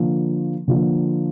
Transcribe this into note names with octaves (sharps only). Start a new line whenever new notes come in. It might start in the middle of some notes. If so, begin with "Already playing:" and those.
Already playing: D3 F3 A#3
D3 F3 A#3